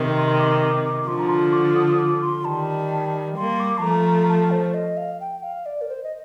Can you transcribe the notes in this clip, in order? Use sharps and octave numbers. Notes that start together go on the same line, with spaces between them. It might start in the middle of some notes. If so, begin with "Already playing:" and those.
Already playing: C3 D#3
C6
D6
D6
D6
D3 F3 C6
A#5
C6
D6
D#6
D#6
D6
C6
D#3 G3 A5
G3 A#3 C6
D6
A5
F3 A3 A#5
A5
C5
D#5
F5
G5
F5
D5
A#4
C5
D#5